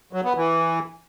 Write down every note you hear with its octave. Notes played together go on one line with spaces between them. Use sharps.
F#3
B3
E3